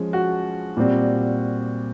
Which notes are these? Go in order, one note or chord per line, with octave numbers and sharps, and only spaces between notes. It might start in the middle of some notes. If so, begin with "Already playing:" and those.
Already playing: F3 G#3 C#4
F#4
A#2 G3 C4